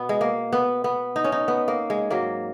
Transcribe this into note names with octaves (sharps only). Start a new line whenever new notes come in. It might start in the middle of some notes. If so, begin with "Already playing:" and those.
Already playing: B2 B3
G#3
A#3
B3
B3
D#4
C#4
D#4
B3
A#3
G#3
G#2 F#3 A#3